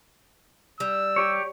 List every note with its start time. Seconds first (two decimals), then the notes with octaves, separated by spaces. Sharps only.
0.80 G3 E6
1.16 G4 C#5